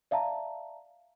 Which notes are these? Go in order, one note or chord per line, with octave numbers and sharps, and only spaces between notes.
D5 E5 F5 A5 A#5